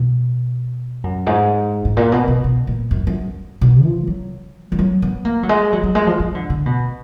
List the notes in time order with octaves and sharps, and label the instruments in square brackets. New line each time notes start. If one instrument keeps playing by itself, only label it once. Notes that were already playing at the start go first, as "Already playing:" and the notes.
Already playing: [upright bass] B2
F#2
G#2
G#2
A#2
B2
B2
B2
A#2
F#2
F#2
B2
F3
F#3
F3
F#3
B3
A#3
F#3
G#3
F#3
F#3
G#3
F3
F3
D3
D3
B2